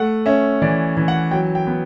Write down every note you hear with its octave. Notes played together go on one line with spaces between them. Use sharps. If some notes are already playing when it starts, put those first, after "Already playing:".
Already playing: A3 F#5
C#4 E5
E3 D5
E3
F#5
F#3 G5
G5
B3